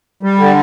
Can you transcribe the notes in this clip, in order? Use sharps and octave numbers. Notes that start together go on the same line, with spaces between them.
G3
D3